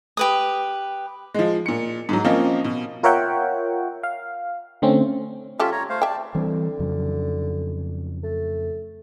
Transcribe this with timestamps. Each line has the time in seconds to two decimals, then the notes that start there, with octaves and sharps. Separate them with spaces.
0.17 G4 B4 D#6
1.34 F3 G#3
1.66 A#2 C#7
2.09 G#2 F#3
2.24 F3 A#3 C4 C#4 D#5 F5
2.64 B2
3.03 F4 A#4 C#5 E5 F#5 G5
4.03 F5
4.82 D3 A3 C4 C#4
5.60 G3 C#4 F4 G4 A4 E5
5.72 C#5 A#5
5.89 A3 C5 F5
6.02 D5 E5 G5 A5
6.35 D3 E3 G3 C4
6.79 F2 C#3 F#3
8.23 A3